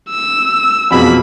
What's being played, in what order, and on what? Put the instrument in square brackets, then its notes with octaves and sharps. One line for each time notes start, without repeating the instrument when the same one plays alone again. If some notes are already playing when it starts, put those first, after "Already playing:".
[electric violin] E6
[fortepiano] F2 B2 G#4 [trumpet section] A#3 B5